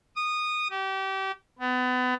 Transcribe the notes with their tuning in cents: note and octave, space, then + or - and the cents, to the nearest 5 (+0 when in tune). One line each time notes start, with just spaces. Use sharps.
D#6 -15
G4 -30
B3 +30